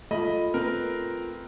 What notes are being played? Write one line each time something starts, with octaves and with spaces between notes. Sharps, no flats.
A3 F4 D#5 B5
C4 A#4 B4